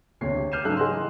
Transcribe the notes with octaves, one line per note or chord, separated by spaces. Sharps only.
E1 D2 C3 C#5 C7
G4
D6 F6 G6 C7 D#7 E7
G#2 C#3 F#3 A3 E6 F#6
G#4 D#5 F#5 C6
E3